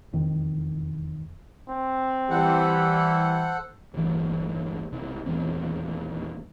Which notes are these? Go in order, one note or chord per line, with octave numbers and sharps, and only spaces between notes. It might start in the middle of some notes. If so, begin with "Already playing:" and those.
E1 F2 D#3
C4
E3 G3 A4 C5 F#5
D1 G1 E3 F#3
B1 C3
D#1 E2 C4